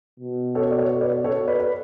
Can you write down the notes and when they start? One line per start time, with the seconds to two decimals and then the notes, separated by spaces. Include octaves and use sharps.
0.20 B2
0.55 A4 C#5
0.71 D5
0.78 A4 C#5
1.01 B4 D5
1.24 A4 C#5
1.48 B4 D5
1.60 B4